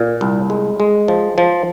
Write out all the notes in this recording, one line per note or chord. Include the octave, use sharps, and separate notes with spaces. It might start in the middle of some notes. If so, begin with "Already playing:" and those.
Already playing: A#2
C2
G#3
G#3
F3
F3